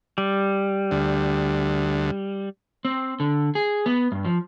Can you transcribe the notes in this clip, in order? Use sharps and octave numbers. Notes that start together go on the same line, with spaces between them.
G3
D2
C4
D3
G#4
B3
G2
F3